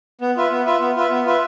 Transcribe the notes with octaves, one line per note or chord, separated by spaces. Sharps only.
B3
F4 B4 E5
B3
F4 B4 E5
B3
F4 B4 E5
B3
F4 B4 E5